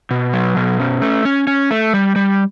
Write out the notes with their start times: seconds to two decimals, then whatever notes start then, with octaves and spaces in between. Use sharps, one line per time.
0.11 B2
0.33 F#3
0.56 B2
0.79 C#4
1.02 A3
1.25 C#4
1.47 C#4
1.71 A3
1.94 G3
2.16 G3